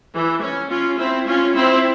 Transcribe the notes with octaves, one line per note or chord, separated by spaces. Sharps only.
E3
C#4
C#4 F4
C4 E4
C#4 F4
C4 E4